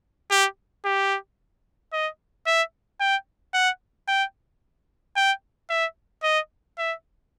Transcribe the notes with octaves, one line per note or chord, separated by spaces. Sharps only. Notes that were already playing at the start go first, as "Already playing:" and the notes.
G4
G4
D#5
E5
G5
F#5
G5
G5
E5
D#5
E5